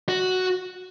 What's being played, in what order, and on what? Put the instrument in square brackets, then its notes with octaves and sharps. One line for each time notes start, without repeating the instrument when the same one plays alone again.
[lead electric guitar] F#4